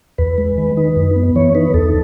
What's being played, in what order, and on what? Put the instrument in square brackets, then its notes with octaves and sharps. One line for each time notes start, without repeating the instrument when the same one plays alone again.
[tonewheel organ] E2 B4
G#3
D#3
D#4
F#2
B3
E3 C#5
D#4 B4
E2 A4